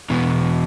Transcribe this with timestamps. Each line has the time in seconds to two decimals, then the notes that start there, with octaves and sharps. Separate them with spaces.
0.10 E2 B2